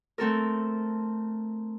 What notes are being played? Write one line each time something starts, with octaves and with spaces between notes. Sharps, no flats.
A3 C4 A4 A#4